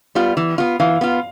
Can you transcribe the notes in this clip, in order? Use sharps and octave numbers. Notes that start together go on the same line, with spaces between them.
G3 B3 F4
E3
B3 F4
E3 F5
B3 F4